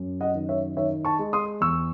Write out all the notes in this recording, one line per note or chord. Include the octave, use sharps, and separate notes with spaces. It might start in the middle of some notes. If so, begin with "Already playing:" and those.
Already playing: F#2
D#5 F#5
D#3
C#5 E5
D#3 C#5 E5
A5 C#6
G#3
C6 D#6
E2 C#6 E6